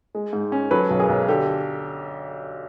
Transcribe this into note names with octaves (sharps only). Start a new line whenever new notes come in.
G#3
G#2
C#4
F#3 A4 B4
B1
G#4 A#4
B1
D3 G4 A4